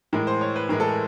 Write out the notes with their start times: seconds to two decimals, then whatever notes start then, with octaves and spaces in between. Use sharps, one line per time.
0.13 A2 E3 G#3 A#4
0.27 C5
0.41 C#5
0.56 B4
0.69 A2 E3 G#3 A#4
0.80 A4
0.89 A#4